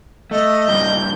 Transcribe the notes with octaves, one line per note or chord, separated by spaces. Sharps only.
A3 D#5
G2 A#2 G6